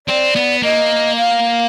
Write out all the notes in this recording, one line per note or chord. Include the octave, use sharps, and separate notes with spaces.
C4 D5
B3
A#3 D#5
F5